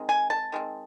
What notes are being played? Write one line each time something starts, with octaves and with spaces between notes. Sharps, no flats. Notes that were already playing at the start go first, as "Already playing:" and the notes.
Already playing: D#3 G#3 C4
G#5
A5
D#3 G#3 C4